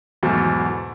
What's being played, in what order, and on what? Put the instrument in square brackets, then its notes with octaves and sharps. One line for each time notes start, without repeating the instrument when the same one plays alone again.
[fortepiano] E2 G#2 B2 F#3 A3